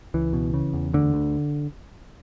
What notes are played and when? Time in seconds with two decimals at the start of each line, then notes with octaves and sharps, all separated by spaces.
0.14 C#2 E3
0.33 B2
0.54 C#3
0.73 E2
0.94 D2 D3
1.14 D2